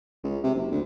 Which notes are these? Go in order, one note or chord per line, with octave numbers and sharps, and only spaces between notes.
C#2
C3
F#1
D2